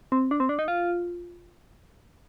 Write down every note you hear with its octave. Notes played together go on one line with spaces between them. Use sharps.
C4
D4
C4
D4
D#4
F4